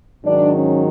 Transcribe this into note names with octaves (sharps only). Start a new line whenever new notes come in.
G#2 D#3 F#3 D4
C#4